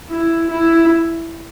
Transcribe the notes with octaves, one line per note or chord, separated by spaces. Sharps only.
E4
E4